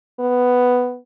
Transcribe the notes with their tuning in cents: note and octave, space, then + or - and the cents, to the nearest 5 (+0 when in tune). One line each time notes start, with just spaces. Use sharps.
B3 +5